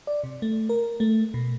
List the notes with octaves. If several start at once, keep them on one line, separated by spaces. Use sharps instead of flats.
D5
C3
A3
A#4
A3
B2